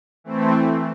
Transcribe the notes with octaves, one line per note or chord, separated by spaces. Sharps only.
E3 A3 C4